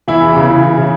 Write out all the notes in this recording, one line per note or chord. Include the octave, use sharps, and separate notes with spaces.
E3 E4
E2
C#3
E3
E3
C#3